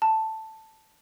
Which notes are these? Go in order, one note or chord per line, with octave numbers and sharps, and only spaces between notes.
A5